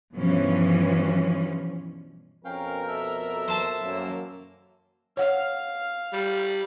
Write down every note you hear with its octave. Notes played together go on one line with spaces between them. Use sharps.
G2 B2 E3 F3 C#4
F2 B2 C#4 A#4 F5 G5
A4 E5 E6
C5 A5 C6
F#2 A#3
C#5 F5 F#5
G3